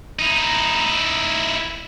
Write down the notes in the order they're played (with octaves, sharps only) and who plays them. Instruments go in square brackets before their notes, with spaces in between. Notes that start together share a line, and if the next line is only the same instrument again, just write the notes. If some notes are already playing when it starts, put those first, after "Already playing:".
[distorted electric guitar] D#4 E4